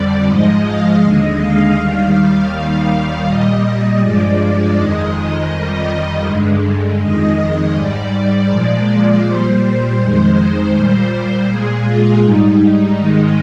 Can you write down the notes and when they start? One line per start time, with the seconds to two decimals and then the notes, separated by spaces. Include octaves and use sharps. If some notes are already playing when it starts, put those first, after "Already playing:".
Already playing: F2 D3 G3 D5
0.28 G#2 F3 G#3 D#5
0.65 F5
1.03 D#2 D3 G#3 D#5
1.40 F5
1.77 D#2 D#3 G3
2.52 D#2 D#3 G3
3.26 A#2 G3 D#5
4.01 G2 F3 G#3 D5
4.75 F2 D#3 G#3 D#5
5.50 F2 D#3 G3 D#5
6.25 G2 D3 G#3
7.00 F2 D#3 G#3 D#5
7.74 G#2 G3 D5
8.49 A#2 F3 G#3
9.24 A#2 G3 C5
9.99 F2 D#3 G#3
10.74 A#2 G3
11.48 A#2 G#3 G#4
11.85 F4
12.23 G#2 G3 D#4
12.98 G#2 D#3 G#3 D#4